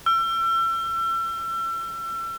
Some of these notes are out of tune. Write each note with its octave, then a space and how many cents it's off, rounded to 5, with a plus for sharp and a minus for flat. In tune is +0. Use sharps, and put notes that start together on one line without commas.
E6 +35